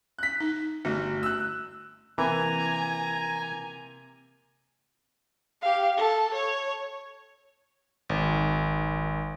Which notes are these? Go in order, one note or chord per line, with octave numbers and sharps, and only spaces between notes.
F#6 B6
D#4
G1 A3 F#4
E6 F#6
C3 E3 A#3 G#5 A#5
G4 F5
A4
C#5
G#1